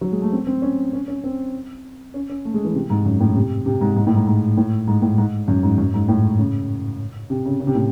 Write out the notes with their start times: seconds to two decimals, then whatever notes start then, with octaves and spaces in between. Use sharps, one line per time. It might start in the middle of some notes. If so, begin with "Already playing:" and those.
0.01 F#3
0.12 G#3
0.22 A3
0.32 C4
0.47 C4
0.62 C#4
0.93 C#4
1.08 C#4
1.24 C4
2.14 C#4
2.29 C#4
2.45 A3
2.54 G#3
2.65 E3
2.75 C3
2.90 G#2
3.05 F#2
3.20 A2
3.36 C3
3.66 C3
3.81 G#2
3.96 G#2
4.07 A2
4.16 G#2
4.27 G#2
4.57 A2
4.88 G#2
5.02 A2
5.18 G#2
5.48 F#2
5.63 G#2
5.78 F#2
5.94 G#2
6.08 A2
6.39 C#3
7.30 C3
7.46 C#3
7.60 C#3
7.67 C3
7.75 A2